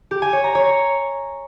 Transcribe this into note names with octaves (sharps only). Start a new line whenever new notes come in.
G4
G#5
C#5
A#5
C#5